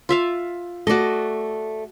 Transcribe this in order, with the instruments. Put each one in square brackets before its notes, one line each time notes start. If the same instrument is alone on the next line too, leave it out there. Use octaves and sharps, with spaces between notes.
[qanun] F4 E5 F5
[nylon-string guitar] A3 D5 [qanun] F#4 D#5